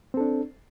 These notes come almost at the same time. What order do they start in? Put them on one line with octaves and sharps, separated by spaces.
C4 A4 D4